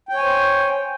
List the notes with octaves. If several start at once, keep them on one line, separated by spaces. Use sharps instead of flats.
C5 C#5 G5 G#5